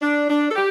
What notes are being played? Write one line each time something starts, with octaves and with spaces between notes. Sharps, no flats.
D4
D4
A4
G4